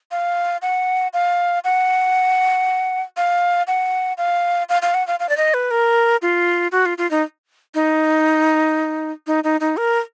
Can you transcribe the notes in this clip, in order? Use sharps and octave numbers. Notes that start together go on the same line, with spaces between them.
F5
F#5
F5
F#5
F5
F#5
F5
F5
F5
F#5
F5
F5
D5
D#5
B4
A#4
F4
F#4
F4
F4
D#4
D#4
D#4
D#4
D#4
A#4